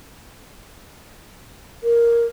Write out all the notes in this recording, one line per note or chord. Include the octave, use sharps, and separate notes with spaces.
A#4